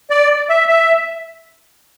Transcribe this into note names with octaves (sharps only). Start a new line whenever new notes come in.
D5
E5
E5